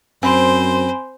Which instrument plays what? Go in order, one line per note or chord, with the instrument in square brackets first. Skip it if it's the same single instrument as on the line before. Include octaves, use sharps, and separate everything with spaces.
[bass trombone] F#2 [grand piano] C4 [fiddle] C5 [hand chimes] G#5 B5 C6